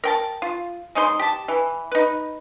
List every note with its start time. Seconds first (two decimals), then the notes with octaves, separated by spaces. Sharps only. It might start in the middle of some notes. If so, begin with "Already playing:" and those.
0.04 A#4 G5 A5
0.42 F4
0.95 G#3 D#4 C5 C6
1.19 G4 A5
1.48 E3
1.92 D#4 B4